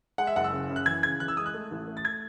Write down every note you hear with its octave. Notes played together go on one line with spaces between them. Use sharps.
G#3 F#5
E5
F#1 F#5
E6
C#3
F#2
F#6
E3 G#6
C#3 G#6
E3 F#6
E6
G#3 D#6
F#6
A3
A1
A3
A6
G#6